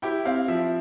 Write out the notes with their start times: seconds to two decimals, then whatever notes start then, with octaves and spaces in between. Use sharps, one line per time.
0.02 E4 G4 G5
0.25 C4 F5
0.48 F3 E5